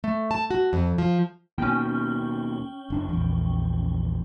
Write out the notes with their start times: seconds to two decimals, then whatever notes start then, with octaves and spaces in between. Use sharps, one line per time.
0.04 A3
0.31 A5
0.51 F#4
0.73 F2
0.98 F3
1.58 D#2 B2 C#4 G5
2.90 F#1 D4
3.09 A#1 E2